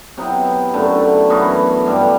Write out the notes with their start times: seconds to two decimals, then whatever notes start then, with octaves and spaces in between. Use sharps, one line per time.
0.17 C3 F#3 B3 E4
0.74 F#2 D3 A3
1.30 F#2 E3 B3 F#4
1.86 G2 D3 G3